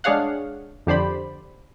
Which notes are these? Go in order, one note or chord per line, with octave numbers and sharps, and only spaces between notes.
G#3 D4 G#4 C#5 F5 F#5
F2 D3 G4 C5 D5 B5